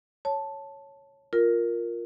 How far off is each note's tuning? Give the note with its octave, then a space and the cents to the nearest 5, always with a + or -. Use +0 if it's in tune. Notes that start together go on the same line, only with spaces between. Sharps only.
C#5 +0 A5 +0
F4 +5 A#4 +0